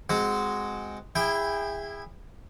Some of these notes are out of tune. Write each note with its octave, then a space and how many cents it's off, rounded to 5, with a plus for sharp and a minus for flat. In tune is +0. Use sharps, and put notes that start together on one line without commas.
G#3 +0 C4 -15 F#4 +0
E4 +0 G#4 -30 G5 +0